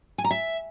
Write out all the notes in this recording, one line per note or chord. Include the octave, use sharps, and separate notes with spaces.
G#5
A#5
E5